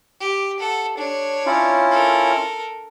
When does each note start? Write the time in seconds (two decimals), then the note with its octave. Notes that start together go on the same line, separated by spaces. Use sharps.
0.20 G4
0.59 A4 F#5
0.97 D4 C#5
1.46 C#4 E4 F4
1.91 A4 A#4